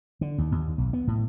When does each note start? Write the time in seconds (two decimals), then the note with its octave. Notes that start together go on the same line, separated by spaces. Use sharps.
0.21 D3
0.38 D#2
0.52 D#2
0.78 B1
0.93 B3
1.07 A2